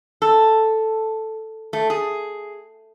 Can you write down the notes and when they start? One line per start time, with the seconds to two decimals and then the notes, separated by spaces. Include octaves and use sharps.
0.22 A4
1.73 A3
1.90 G#4